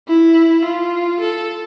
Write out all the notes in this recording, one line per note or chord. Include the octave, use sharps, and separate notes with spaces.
E4
F4
A4